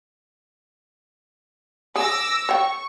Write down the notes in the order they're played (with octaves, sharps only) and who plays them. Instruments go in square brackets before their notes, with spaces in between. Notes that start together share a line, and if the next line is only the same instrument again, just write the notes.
[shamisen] G#4 G#5 [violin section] D6 E6 A#6
[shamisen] C#5 G5 [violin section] C#6